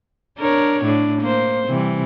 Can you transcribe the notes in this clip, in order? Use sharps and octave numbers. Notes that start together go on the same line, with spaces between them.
D4 A#4 C#5
A2 D4
A#3 C5
C3 E3 G3